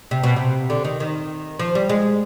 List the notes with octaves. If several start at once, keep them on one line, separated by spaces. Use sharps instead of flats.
C3
B2
C3
D3
D#3
D#3
F3
G3
G#3